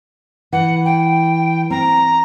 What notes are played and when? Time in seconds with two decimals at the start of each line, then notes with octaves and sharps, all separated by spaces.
0.53 E3 F#5
0.85 G5
1.70 C4 A#5